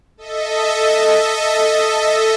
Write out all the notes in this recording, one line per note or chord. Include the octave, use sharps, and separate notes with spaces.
A4 D#5 E5